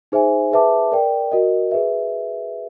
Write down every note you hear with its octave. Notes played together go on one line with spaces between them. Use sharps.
D#4 G#4 C5 E5 G#5
G#4 B4 E5 A5 D6
A#4 D5 G5
F#4 A#4 D#5
G#4 B4 E5